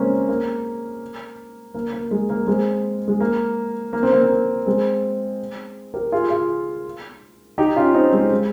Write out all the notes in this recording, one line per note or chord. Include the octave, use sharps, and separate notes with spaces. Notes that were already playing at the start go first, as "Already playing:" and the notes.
Already playing: G#3 A#3 C4 C#4
A#3
A#3
A#3
G#3
A#3
G#3 C4
G#3
A#3
A#3
C4
A#3
C4
A#3
G#3 C4
G4 A#4
F4 G#4
F4 G#4
D#4 G4
C#4 F4
C4 D#4
G#3 C4
G#3